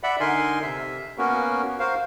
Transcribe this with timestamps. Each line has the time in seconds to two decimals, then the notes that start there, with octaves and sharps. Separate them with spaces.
0.03 D5 E5 F#5 B5
0.20 D3 D#4 A#4 G#5 C6
0.63 C3 E5
1.18 A#3 B3 C#4 F#4 A#4
1.79 F#4 A#4 C5 F5